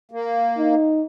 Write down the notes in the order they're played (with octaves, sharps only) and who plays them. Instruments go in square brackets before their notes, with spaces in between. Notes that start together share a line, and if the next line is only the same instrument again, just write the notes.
[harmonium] A#3
[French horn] D#4